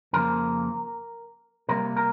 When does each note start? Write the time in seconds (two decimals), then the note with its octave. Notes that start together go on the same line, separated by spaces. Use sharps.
0.13 F2 C#3 F3 A#3 A#4
1.69 C3 G3 A#3 A#4
1.97 A#4